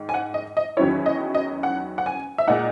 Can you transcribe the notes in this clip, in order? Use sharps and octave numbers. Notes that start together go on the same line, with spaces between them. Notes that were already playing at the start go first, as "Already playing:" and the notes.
Already playing: G#2 D#3
G#5
F#5
D#5
D#5
E2 D#3 F#3 C#4 E4 C#5
D#5
D#5
F#5
F#5
G#5
E5
A#2 G#3 D#4 F#5